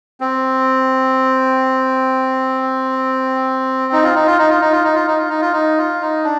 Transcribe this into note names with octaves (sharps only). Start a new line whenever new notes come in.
C4
D#4
F4
D#4
F4
D#4
F4
D#4
F4
D#4
F4
D#4
F4
D#4
F4
D#4
F4
D#4
D4